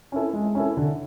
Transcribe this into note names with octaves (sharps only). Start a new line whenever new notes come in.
C#4 E4 A4
G#3
C#4 E4 A4
D3